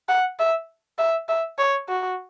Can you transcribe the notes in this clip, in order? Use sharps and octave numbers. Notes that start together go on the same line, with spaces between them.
F#5
E5
E5
E5
C#5
F#4